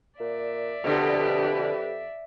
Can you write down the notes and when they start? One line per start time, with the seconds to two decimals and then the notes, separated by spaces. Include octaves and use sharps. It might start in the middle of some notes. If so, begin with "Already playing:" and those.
0.20 A#2 D5 E5
0.84 F2 B2 D3 G4 B4